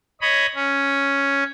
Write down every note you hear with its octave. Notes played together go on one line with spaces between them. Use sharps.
C#5 D#5 B5
C#4